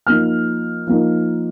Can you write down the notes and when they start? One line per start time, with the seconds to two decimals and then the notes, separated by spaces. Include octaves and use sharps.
0.07 F3 A#3 D#4 F6
0.87 F3 A#3 D#4